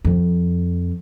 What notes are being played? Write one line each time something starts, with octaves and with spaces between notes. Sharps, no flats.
F2